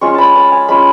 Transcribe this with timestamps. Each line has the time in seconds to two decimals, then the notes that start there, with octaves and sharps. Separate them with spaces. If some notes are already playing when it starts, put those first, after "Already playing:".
0.01 G#3 C#4 F4 C#6
0.14 A5 B5
0.35 A5
0.52 G#5
0.68 G#3 C#4 F4 B5